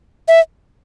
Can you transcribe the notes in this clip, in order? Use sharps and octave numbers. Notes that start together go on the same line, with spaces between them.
E5